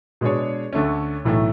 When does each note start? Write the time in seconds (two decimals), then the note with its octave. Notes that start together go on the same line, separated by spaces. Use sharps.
0.21 B2 G#3 D4 G#4 C#5
0.73 D2 D3 A3 C#4
1.25 B1 A2 E3 A3